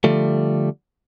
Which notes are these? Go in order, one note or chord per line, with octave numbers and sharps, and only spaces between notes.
D3 F3 G3 A3